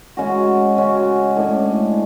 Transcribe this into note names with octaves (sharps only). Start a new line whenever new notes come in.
C#3 G#3 C#4 F#4
C#3 G#3 C#4 F#4
A2 G#3 D4